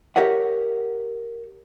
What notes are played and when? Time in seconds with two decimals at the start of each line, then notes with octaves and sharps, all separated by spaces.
0.16 G4 A#4 C#5 E5 F#5